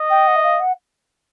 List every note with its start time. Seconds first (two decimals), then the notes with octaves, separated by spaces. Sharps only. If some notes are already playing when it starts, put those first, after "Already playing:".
Already playing: D#5
0.10 G5
0.27 F#5
0.36 E5
0.43 F5
0.59 F#5